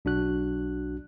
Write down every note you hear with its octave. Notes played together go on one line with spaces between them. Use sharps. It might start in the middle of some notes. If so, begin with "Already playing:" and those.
B1 D4 F#4 F#6